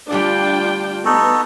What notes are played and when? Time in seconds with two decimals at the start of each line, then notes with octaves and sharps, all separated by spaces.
0.11 D2 G3 D4 F4 G4 G5
1.05 B3 D#4 F#4 A4